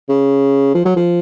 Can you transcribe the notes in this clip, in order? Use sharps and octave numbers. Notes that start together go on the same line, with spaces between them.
C#3
F3
F#3
F3